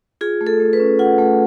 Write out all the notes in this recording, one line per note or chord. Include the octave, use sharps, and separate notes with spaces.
F4 G#4
A3
A4
A3
B4
C#4
F4 F#5
A3